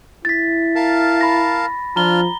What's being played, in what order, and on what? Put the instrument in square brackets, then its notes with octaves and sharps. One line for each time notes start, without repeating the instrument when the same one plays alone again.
[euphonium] E4 [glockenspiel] A6 B6
[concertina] A#4 F5 A5
[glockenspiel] B5 A#6
[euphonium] F3 [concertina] D4 F4 F6 [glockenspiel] A#5 G7